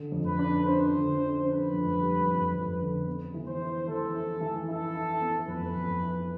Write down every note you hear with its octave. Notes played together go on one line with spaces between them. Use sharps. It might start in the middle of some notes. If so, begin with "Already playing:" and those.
Already playing: D3
F2
B4
D4
D4 C5
D3
D4
D4 B4
F2
G3
F2
F2
D3
B3
E3
C5
E4
E3 A4
E4
E3
E4 A4
E4
B3
F2 B4
F2
E4